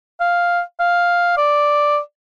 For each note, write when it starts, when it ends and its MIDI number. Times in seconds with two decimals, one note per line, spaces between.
0.20 0.60 77
0.80 1.35 77
1.37 1.99 74